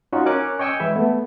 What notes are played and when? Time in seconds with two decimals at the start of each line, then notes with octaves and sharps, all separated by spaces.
0.13 C#4 D#4 F4 F#4
0.26 C#4 A#4 D6 F#6
0.59 C#5 D#5 G5 G#5 C#6 E6
0.80 E3 G#3 E4 E5
0.96 A3 B3